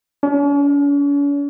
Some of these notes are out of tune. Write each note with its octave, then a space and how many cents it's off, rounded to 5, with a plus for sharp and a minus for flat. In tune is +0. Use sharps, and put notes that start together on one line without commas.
C#4 +45